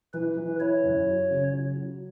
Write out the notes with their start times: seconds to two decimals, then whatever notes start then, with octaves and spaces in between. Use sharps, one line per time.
0.14 E3 B4
0.37 E3
0.60 E4 C#5
0.83 F#2
1.07 F#3
1.30 C#3
1.53 F#3
1.76 F#3